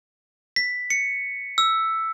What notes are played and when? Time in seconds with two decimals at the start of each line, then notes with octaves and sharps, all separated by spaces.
0.56 B6
0.90 C#7
1.58 E6